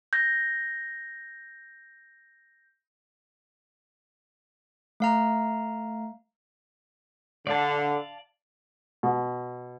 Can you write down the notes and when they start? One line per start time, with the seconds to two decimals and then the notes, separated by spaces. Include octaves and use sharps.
0.13 G6 A#6
5.00 A3 F5 A#5
7.47 D3 D5 F5 A5
9.03 B2